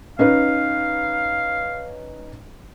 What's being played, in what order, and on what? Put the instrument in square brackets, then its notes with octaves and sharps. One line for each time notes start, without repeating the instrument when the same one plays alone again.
[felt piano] C#4 D#4 B4 [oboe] F5